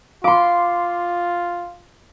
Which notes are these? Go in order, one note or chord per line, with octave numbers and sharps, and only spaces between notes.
F4 F5 C6 D6